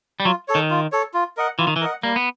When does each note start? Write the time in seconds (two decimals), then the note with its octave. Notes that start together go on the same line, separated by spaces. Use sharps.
0.20 G3
0.25 F#3 F4
0.48 A4 C#5
0.55 D#3
0.70 F4
0.92 A4 C#5
1.14 F4
1.37 A#4 D#5 F#5
1.59 E3 F4
1.67 D#3
1.76 E3
1.81 A#4 D#5 F#5
2.03 G3 A#3
2.16 B3